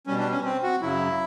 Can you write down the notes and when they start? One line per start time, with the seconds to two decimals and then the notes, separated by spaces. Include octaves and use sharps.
0.07 B2 G3 C#4
0.19 D4
0.32 C#4
0.44 C4
0.63 F#4
0.82 F#2 C#3 F#3 E4